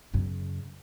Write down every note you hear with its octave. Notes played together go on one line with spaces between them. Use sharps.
F#2 C#3